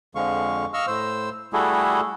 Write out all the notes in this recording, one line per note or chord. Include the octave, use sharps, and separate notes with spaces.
F2 D3 F3 G#3 F5 C#6
D#5 F5 C#6 E6 F6
A2 C5 E6
G3 A3 E4 F#4 G#4 A4